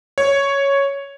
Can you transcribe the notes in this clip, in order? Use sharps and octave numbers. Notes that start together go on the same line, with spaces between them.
C#5